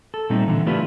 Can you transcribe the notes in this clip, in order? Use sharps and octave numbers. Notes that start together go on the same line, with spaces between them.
A4
A#2 G3 A3 C4 D#4
D3 E3
A3 D4 E4 F4 G4 B4